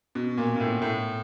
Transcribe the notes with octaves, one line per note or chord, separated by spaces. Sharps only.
B2
A#2
A#2
A2
A2